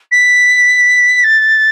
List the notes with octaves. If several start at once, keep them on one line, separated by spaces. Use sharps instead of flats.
B6
A6